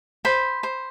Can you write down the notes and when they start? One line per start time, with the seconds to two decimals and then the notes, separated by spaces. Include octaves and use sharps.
0.25 C5 B5
0.63 C5